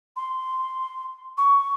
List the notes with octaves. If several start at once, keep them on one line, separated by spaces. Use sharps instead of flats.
C6
C#6